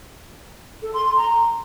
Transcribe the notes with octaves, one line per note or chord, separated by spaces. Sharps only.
A4
C6
C6
A#5